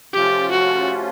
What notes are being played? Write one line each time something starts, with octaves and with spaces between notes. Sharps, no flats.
C3 F3 A3 C#4 F4 G4
F#4